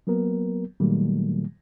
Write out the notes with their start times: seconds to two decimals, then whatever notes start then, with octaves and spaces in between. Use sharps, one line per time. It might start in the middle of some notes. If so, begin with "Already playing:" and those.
0.07 F#3 A#3 B3 A#4
0.80 A#2 D#3 F#3 G3 A3 A#3